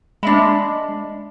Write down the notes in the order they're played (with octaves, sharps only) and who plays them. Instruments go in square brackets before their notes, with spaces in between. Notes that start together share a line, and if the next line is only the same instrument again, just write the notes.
[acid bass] G#3 [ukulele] D4 E5 B5